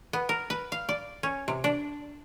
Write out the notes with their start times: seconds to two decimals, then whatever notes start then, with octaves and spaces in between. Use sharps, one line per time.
0.13 B3
0.29 A#4
0.50 B4
0.72 F5
0.89 D5
1.23 C#4
1.48 C3
1.64 D4